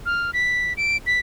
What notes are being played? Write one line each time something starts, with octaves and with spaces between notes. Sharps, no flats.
F6
B6
D7
B6